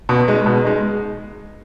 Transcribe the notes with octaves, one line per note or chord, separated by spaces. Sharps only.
B2
G#3 D#4
B2
G#3 D#4